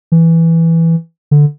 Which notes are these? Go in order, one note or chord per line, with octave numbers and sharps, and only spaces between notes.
E3
D3